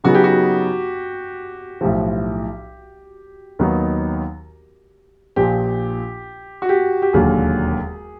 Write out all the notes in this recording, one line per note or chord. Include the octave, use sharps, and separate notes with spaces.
C#3 F#3 B3 D#4 F#4 G#4
G4
F#4
B1 A2 F3 G4
D#2 D#3 F#3 B3 D#4
A#1 A#2 F3 G4
F#4
G4
G4
E1 D#2 D3 F#3 A#3 G#4